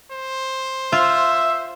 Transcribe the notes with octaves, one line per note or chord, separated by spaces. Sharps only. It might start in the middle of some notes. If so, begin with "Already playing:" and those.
C5
F4 E5